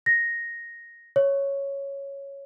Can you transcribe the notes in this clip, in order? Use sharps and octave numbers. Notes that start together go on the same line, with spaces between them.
A#6
C#5